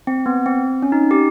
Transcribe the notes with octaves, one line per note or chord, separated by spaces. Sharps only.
C4
B3
C4
C#4
D#4
G4